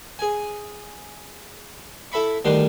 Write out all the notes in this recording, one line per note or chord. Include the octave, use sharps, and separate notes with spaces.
G#4 G#5
E4 A4 E5 B5 C#6
D2 D#3 G3 D4 C6